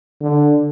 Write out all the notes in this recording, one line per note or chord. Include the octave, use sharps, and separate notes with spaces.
D3